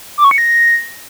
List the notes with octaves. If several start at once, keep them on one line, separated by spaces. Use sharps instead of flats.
D6
C#6
C#7
A#6